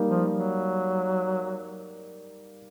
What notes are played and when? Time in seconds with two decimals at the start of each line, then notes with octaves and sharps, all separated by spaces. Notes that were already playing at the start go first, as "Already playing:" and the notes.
Already playing: G3 A#3 D#4
0.09 F3
0.32 F#3